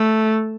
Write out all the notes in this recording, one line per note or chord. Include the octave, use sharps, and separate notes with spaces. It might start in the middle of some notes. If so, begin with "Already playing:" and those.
Already playing: A3